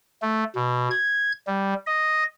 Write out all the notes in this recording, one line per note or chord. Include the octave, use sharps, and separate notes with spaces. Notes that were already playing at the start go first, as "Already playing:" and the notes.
A3
B2
G#6
G3
D#5